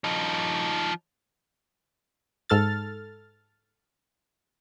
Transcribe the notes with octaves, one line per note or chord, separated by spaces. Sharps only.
F3 D#4
G#2 A4 F6 A6